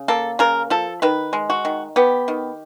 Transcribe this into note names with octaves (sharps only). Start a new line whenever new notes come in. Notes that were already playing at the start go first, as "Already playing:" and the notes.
Already playing: C#3
A#3 A4
C#3 A#4
F3 A4
D#3 B4
G#3
F#4
D#3
B3 G4
D#3